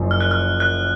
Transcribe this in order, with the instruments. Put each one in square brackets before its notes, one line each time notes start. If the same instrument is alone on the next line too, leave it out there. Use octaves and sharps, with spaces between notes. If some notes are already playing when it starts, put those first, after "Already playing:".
Already playing: [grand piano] F#1 F#2 F3
[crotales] F6
F#6
F6
F#6